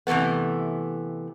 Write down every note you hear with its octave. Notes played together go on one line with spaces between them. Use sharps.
C3 E3 F#3 A3 B3